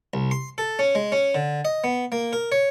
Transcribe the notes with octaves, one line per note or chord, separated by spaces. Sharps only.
C2
C6
A4
C#4
G#3
C#4
D3
D#5
B3
A#3
A#4
C#5